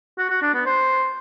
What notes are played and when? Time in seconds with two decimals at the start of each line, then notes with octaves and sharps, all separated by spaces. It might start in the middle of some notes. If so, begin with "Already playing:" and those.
0.18 F#4
0.30 F#4
0.42 D4
0.54 B3
0.66 C5